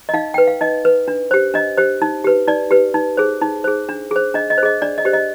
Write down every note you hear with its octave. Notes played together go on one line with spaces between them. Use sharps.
D#5
D#4 F5
B4 G5
F5
D#4 D#5
B4
D4
G4 C5
D4 D#5
G4 C5
D#4
G4 B4
D#4 D5
G4 B4
D#4
G#4 C5
D#4
G#4 C5
D4
G#4 C5
D4 D#5
D#5
C5
G#4 D#5
D4 D5
D#5
G4 C5
D#5